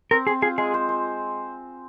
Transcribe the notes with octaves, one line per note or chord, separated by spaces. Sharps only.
C4 A#4
C4 G#4
F4 G#4
G#3 G#4
C5
C5